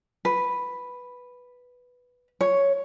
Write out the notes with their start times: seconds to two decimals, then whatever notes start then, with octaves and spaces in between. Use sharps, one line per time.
0.25 B4
2.41 C#5